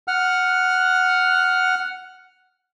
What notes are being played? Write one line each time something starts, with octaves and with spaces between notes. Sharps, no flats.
F#5 F6